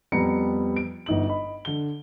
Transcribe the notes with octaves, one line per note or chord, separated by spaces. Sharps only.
F2 G3 B3 A#5 C#7
D7
G1 D#4 F#7
D#5 B5
D3 G7